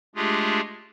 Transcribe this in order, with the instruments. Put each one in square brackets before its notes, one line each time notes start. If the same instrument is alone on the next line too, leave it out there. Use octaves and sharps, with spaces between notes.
[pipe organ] G#3 A3 D4 F4 G4 G#4